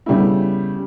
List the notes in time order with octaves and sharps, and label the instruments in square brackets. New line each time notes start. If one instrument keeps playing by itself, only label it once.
[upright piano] C#3 G3 A3 B3 E4